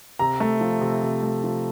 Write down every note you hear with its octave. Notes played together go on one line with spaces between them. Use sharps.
C3 A#5
A3
F3
C3
C3
A3
F3